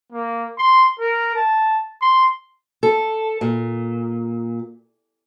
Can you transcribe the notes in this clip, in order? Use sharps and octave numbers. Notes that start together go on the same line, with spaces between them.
A#3
C6
A#4
A5
C6
A4
A#2